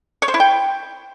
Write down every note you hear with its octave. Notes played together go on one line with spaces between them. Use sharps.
C#5
C5
E4
G5